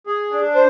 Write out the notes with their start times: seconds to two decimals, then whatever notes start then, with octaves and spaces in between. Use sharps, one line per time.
0.07 G#4
0.31 D4
0.54 C5